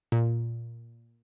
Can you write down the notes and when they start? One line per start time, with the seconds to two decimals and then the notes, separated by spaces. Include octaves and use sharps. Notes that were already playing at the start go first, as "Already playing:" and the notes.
0.12 A#2